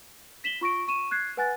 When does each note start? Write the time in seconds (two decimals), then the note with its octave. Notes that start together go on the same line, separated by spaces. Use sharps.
0.44 A#6 B6 E7 F#7 G7
0.61 F4 C#6 A#6 D7
0.88 C#6 D#7 E7
1.11 F#6 G#6 C7
1.37 B4 F#5 G#5 F#6 A6